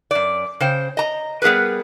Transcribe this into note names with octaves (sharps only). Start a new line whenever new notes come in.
F#2 D5
C#3 C5 G5
D#5 A#5
G3 B3 G#4 A#4 B4